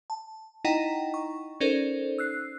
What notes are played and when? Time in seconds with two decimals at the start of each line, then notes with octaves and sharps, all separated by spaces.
0.10 A5
0.65 D#4 E4 D#5 F#5 G5 A#5
1.14 C#6
1.60 C#4 D#4 A4 A#4 C5 D5
2.18 E6 F#6 C7